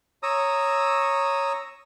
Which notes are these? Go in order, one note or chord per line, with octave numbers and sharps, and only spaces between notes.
C#5 A#5 D#6 E6